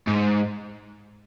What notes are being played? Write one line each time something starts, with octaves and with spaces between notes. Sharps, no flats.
G#2